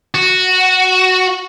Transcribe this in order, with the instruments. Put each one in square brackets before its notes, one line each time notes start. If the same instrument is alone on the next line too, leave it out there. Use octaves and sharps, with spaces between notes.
[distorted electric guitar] F#4